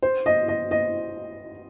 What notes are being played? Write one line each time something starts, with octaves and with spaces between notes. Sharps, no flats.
C5
D#5
D#5
D#5